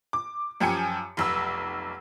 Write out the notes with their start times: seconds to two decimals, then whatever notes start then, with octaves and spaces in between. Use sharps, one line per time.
0.13 D6
0.60 F#2 F3 G4 G#5 C#7
1.17 F1 B1 E6